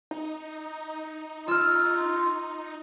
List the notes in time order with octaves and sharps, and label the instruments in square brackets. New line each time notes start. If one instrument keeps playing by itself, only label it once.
[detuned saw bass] D#4
[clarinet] F4 [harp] E6 F6